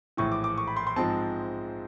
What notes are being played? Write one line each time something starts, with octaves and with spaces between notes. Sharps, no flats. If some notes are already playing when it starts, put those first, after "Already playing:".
A#1 A2 E3 C#6
D6
D6
C#6
B5
C6
C6
G#2 F3 G#3 C4 A5